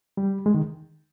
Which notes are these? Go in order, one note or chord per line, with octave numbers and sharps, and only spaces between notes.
G3
G#3
D#3